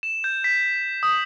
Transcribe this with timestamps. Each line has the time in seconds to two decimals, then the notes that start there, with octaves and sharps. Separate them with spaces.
0.03 E7
0.24 G6
0.44 B6
1.03 D#6